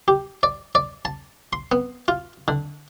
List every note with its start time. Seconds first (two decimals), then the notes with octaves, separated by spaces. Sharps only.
0.08 G4
0.43 D5
0.75 D5
1.05 A5
1.53 C6
1.72 B3
2.08 F4
2.48 D3